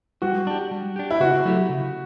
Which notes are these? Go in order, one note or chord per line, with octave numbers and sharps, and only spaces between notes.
G3 F#4
D4 G4
G3
D4 G4
E4
C#3 F#4
F#3 A3 E4 G4
C#3